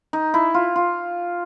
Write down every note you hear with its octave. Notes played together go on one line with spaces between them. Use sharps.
D#4
E4
F4
F4